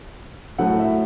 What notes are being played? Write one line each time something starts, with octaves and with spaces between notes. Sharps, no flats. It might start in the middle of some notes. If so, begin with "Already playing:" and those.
A2 F#3 A3 F#5
E5